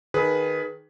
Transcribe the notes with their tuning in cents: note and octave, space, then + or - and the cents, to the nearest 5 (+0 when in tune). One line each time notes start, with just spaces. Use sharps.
D#3 +0 G#4 +20 B4 +0